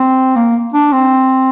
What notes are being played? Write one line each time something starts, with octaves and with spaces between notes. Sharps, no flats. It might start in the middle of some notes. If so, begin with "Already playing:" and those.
Already playing: C4
A#3
D4
C4